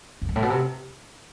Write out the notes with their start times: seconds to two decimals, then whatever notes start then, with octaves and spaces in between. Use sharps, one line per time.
0.22 F2
0.29 G2
0.36 A2
0.43 B2
0.50 C3